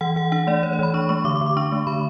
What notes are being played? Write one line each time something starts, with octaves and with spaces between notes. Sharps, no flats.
E3 F#5
E3 F#5
D4 F#5
A3 D5
E3 C#5
C#5
E3 B5
D4 C#6
A3 C#6
D3 D6
D6
D3
D6
D4 C#6
A3
D3 B5